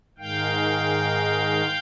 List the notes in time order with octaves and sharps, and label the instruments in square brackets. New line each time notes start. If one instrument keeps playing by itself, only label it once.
[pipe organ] G#2 D#3 G#3 F5 G5